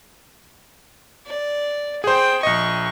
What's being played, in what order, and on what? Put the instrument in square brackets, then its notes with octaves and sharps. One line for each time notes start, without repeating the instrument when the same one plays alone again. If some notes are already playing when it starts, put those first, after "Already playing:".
[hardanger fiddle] D5
[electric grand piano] G#4 C5 [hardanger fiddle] G5
[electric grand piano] A#1 D#5 [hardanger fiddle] C#6